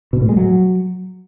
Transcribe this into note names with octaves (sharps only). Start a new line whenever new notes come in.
B2
A2
G#3
F#3